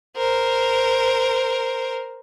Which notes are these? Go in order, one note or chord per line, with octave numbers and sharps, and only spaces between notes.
A#4 C5